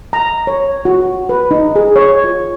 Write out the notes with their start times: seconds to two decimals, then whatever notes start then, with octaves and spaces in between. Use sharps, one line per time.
0.13 A#5
0.47 C#5
0.85 F#4
1.29 B4
1.51 D#4
1.76 G#4
1.96 C#5
2.24 F4